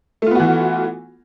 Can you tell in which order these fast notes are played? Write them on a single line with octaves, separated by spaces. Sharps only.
A3 F4 B3 F#4 E3